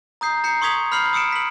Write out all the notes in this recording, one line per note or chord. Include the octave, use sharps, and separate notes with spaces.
A#5 D#6 G6 C7
A#5 G6 C7 C#7
C6 C#6 D#6 G#6 B6 F7
B5 F6 G6 C7 F#7
D#6 E6 C#7 D7 E7
B6 F#7